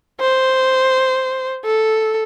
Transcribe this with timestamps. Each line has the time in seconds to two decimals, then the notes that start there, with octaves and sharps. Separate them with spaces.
0.21 C5
1.65 A4